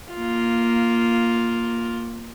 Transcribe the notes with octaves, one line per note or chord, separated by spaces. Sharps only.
A#3 F4